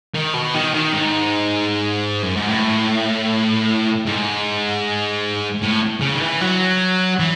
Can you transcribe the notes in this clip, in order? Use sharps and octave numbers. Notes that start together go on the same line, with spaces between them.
D#3
B2
D#3
D#3
G#2
F#2
G#2
A2
G#2
A2
C#3
D#3
E3
F#3
E3